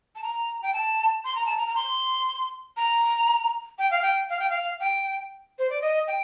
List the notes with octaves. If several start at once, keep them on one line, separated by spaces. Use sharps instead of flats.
A5
A#5
G5
A5
C6
A#5
A5
A#5
A#5
C6
A#5
G5
F5
G5
F5
G5
F5
G5
C5
D5
D#5
G5